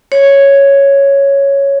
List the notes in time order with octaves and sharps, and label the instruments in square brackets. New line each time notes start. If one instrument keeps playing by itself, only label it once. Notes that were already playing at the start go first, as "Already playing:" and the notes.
[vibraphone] C#5